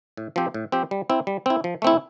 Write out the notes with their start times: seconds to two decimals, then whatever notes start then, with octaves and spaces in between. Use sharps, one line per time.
0.17 A2
0.36 F3 C4 G4
0.54 A2
0.72 F3 C4 G4
0.91 G3
1.10 C4 E4
1.27 G3
1.46 C4 E4
1.64 F3
1.82 A3 C4 E4